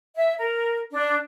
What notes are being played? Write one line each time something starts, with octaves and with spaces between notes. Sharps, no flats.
E5
A#4
D4